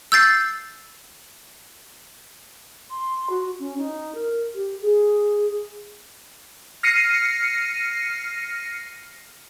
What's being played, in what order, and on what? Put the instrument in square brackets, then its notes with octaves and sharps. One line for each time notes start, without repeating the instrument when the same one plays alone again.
[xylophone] E6 G6 A6 C7
[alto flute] C6
F#4
C#4
D#4
A#4
G4
G#4
[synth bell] F6 A#6 C7 C#7 D#7